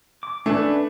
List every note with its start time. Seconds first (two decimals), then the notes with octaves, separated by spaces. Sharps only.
0.23 D6
0.46 A3 C#4 D4 B4